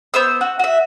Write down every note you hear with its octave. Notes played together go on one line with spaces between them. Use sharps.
B3 C5 E6
F#4
F#4 E5